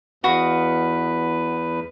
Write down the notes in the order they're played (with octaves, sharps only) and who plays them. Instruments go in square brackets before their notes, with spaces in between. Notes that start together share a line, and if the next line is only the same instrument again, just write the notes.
[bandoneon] E2 B4 [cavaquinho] F#4 D#5 F5